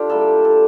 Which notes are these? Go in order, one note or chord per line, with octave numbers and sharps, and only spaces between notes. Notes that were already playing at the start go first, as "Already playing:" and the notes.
Already playing: D3 D4 F4 G4
A2 G3 A#3 A4
A4